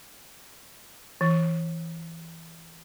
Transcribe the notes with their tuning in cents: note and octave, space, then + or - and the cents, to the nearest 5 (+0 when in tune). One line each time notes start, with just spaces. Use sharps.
E3 +5